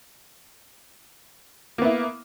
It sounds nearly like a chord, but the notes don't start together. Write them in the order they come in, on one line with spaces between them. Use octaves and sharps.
A#3 B3 E4